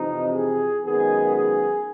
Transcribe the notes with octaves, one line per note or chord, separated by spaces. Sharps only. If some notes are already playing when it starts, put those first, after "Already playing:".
Already playing: F2 C3 E3 D#4
G#4
F#2 D#3 G#3 B3 G#4
G#4